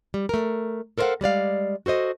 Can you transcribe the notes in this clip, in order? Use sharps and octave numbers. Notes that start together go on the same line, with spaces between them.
G3
A3 A#4
A4 A#4 C5 D5 F5 F#5
G3 G#3 D5 F5
F#4 A4 C5 D#5